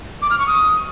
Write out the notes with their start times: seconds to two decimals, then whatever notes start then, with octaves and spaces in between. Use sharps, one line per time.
0.22 D6
0.30 F6
0.39 C#6
0.47 D#6